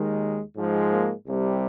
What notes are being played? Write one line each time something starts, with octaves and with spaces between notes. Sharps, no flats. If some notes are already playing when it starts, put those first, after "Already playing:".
Already playing: D#2 D#3 G#3
G#2 F3 G#3
A#3
C2 C3 G3